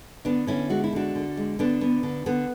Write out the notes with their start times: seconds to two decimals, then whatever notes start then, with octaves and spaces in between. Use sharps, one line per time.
0.25 D3 B3 D4
0.47 D3 C#4 E4
0.70 G#3 F#4
0.84 E4
0.93 D3 D4 F#4
1.15 D3
1.37 G#3
1.59 D3 B3 D4
1.81 B3
2.03 D3
2.26 D3 B3